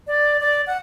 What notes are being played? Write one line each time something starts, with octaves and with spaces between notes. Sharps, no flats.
D5
D5
F#5